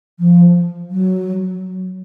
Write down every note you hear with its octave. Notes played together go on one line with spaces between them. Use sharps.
F3
F#3